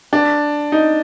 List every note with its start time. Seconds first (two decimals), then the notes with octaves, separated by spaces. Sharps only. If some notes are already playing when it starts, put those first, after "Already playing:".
0.13 D4
0.72 D#4